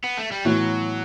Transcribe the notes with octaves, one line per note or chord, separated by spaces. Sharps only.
B3
A3
G3
A2 E3 F#3 B3 F#4